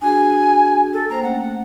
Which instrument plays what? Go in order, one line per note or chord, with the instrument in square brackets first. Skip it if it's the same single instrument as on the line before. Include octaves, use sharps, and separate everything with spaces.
[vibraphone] D4 F#4 G#4 [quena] G#5
[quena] A4
[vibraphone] A#3 C5 G5 [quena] A#5
[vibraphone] A3 C#4 [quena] F#5